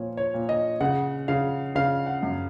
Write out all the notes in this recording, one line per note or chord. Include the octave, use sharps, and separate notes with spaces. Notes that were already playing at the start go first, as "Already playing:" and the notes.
Already playing: A#2 F3 C#5
C#5
A#2
D#5
C#3 F#5
C#3 F5
C#3 F5
F#5
F#2